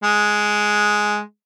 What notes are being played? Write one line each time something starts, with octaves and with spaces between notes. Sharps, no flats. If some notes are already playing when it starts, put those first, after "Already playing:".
G#3